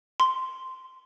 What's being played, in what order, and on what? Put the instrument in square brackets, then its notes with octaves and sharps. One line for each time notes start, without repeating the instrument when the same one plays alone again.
[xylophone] C6